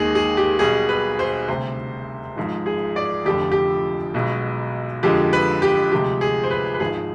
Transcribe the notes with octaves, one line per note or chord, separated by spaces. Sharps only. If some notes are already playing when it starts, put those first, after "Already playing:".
Already playing: D#2 D#3 G#3 G#4
G#4
G4
B1 B2 G3 G#4
B4
C5
D2 C3 G3 C5
G#1 G#2 F3
G#4
D5
F1 F2 D3 F3 G4
G4
B1 B2 G#3
F2 D3 F3 G#3 G4
B4
G4
D2 C3 F3 G#3 G4
G#4
C5
B4
B4
G#1 G#2 F3 G#4